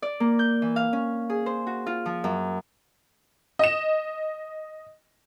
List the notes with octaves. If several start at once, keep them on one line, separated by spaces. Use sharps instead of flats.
D5
A#3
G6
E3
F5
C#4
G#4
C5
F#4
F4
F3
F#2
D#5 E7